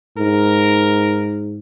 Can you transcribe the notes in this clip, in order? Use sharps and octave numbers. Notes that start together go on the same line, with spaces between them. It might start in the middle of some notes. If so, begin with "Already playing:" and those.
G#2 A#4